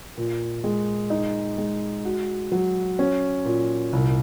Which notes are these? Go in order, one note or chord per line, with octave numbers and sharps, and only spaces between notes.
A#2
G#3
D#4
G#3
F#4
F#3
C#4
A#2
C2